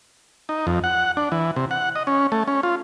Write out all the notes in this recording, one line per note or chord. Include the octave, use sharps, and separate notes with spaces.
D#4
F2
F#5
D4
E3
C3
F#5
D#5
C#4
A3
C#4
F4